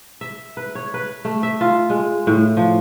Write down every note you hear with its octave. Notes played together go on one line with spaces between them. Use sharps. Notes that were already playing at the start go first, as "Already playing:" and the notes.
E5
B4
C#5
B4
A3
E5
F4
G#3
A2
F3